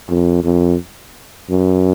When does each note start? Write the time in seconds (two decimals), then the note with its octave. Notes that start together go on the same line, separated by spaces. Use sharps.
0.09 F2
0.44 F2
1.50 F#2